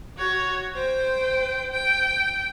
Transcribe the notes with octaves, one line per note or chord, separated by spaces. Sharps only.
F#4 C#5
C5 G5
G5